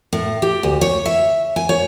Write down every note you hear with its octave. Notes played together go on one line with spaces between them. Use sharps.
A2
G4
D2
C#5
E5
G#5
C#5